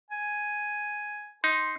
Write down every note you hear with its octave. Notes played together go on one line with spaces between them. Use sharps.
G#5
D#4 C6